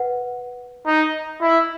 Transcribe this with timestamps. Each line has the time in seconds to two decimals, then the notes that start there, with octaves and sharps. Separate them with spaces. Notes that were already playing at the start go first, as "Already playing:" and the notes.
Already playing: B4 F#5
0.87 D#4
1.41 E4